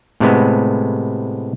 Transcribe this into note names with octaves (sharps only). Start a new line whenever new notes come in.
A2 C3 G#3 B3